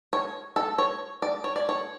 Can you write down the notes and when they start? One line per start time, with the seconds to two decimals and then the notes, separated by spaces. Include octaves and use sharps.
0.13 C#5
0.56 A4
0.78 C#5
1.22 D5
1.44 C#5
1.56 D5
1.69 C#5